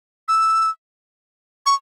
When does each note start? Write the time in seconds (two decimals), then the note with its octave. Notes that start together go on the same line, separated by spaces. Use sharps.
0.28 E6
1.66 C#6